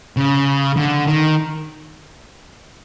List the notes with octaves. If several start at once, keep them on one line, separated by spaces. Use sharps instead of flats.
C#3
D3
D#3